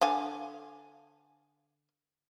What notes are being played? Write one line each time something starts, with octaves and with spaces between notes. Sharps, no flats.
D3 F5 G#5